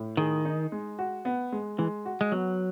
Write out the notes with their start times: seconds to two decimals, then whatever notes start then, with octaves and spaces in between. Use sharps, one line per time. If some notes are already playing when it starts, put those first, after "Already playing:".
Already playing: A2
0.17 D#3 G#4
0.45 D#4
0.72 G#3
0.99 F#4
1.25 B3
1.52 G#3
1.78 E3 G#3
2.05 F#4
2.21 G#3
2.32 F#3 B3